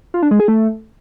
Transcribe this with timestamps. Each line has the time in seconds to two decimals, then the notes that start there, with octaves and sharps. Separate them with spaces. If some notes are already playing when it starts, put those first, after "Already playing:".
0.14 F4
0.22 D4
0.31 G#3
0.40 G#4
0.48 A3